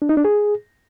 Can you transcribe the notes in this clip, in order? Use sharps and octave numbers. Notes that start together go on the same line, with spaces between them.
D4
D#4
D4
G#4